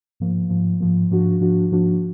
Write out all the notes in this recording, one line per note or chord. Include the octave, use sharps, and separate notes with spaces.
G#2 F3 A#3
G#2 F3 A#3
G#2 F3 A#3
G#2 F3 A#3 D4 F#4
G#2 F3 A#3 D4 F#4
G#2 F3 A#3 D4 F#4